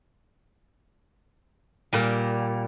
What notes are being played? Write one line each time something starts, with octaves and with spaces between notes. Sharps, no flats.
A#2 G3